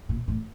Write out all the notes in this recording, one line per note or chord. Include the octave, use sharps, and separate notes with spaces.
A#2
A2